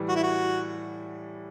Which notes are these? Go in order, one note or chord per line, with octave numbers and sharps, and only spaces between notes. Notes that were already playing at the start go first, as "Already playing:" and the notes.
Already playing: A2 E3 G3
F#4
E4
F#4